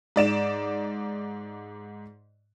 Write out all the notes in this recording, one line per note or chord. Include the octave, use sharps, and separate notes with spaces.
G#2 D5 E7